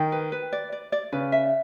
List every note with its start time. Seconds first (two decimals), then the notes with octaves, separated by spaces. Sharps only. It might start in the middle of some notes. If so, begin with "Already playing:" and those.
Already playing: D#3 G5
0.12 B4
0.32 B4
0.53 D5
0.72 D5
0.92 D5
1.12 C#3 B4
1.32 E5